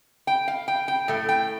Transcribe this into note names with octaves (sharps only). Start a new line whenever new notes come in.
G5
F5
G5
G5
A2 A3
G5